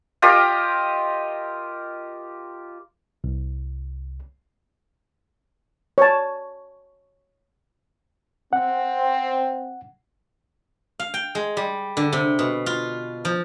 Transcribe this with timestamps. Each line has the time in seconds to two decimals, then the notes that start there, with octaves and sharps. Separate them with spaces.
0.22 F4 G4 A#4 D#5
3.24 C2
5.98 C#5 A5
8.53 C4 F#5
11.00 F5
11.14 G5
11.35 G#3
11.57 G3
11.97 D3
12.13 C3
12.39 B2
12.66 F4
13.25 F3